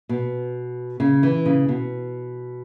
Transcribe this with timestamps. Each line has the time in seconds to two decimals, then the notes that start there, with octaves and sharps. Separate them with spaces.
0.09 B2
1.00 C#3
1.23 E3
1.45 C#3
1.68 B2